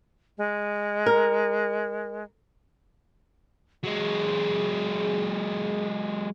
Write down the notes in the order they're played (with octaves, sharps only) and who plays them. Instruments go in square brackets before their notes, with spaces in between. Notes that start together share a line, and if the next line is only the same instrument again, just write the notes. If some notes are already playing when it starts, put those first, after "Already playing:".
[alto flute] G#3
[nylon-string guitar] A#4
[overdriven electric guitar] F#3 G#3 [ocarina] G#4